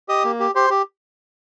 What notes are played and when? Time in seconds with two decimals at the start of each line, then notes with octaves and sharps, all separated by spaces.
0.08 G4 D#5 D#6
0.24 A#3
0.40 G4
0.55 G4 C5 C6
0.70 G4